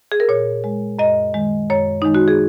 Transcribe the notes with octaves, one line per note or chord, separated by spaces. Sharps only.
G#4
A#4
A#2 C#5
G#3
F#2 D#5
D#3 G#3
F#2 C#5
D#3 G#3 D#4
F#4
G#4